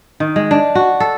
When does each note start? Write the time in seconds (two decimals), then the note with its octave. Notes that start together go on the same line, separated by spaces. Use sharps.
0.20 D#3
0.36 G#3
0.51 D4
0.75 F#4
1.00 A4